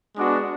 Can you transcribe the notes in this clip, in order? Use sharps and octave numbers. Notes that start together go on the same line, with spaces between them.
G#3 B3 D4 F#4